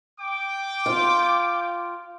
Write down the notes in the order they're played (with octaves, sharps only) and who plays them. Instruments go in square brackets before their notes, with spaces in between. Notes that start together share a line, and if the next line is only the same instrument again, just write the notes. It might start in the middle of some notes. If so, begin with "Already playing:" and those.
[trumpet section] G5 D6
[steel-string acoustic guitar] F4